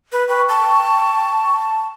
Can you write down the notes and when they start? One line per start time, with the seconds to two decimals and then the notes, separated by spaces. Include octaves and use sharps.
0.12 B4
0.29 B4 G5 C#6
0.49 A5